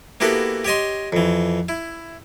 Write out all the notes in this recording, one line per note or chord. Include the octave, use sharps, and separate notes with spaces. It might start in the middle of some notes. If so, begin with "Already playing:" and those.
A#3 B3 E4 F#4 G4 A4
G4 C#5 D#5 C6
F2 E3
E4